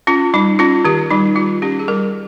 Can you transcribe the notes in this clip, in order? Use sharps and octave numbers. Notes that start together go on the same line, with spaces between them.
C#4 F4
G3 D#4
C#4 F4
D#3 G4
G3 D#4
G3 F4
C#4 G4
G#4
G3 A#4